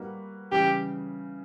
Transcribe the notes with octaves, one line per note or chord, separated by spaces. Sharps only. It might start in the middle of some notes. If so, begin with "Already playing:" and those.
Already playing: G3 A#3 D#4 F#4 B4
C#3 E3 G3 G4